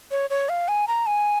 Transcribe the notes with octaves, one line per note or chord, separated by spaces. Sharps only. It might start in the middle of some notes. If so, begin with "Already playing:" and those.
C#5
C#5
F5
G#5
A#5
G#5